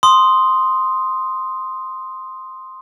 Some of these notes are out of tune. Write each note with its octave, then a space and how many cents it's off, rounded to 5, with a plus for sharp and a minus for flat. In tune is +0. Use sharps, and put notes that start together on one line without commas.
C6 +0 D#6 +0